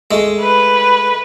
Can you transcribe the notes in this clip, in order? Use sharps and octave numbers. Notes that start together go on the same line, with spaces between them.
G#3 A3
B4